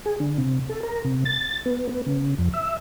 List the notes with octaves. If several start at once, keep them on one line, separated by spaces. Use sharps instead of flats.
G#4
D3
C3
A4
A#4
C3
A6
B3
B3
C#3
F2
E5